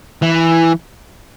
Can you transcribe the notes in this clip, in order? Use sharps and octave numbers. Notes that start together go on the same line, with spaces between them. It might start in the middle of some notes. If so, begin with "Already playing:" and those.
E3